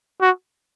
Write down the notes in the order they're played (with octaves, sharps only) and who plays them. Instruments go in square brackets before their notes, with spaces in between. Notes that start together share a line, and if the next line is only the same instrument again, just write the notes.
[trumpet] F#4